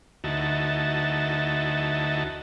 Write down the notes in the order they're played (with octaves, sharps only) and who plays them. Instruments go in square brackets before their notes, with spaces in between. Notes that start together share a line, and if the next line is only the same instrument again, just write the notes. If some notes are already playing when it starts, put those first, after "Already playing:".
[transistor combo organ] D2 D#4 E4 F#4 A5